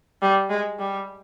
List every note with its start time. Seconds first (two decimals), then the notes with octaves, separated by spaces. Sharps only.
0.22 G3
0.50 G#3
0.79 G3